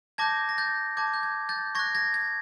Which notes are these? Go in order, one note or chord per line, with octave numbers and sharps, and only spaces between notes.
A5 D6 G6 G#6 A#6
A#6
G6 A6
A5 D6 G6 G#6
G6
G#6
G6 A6
C#6 F#6 G#6 A#6
G#6 A#6
G#6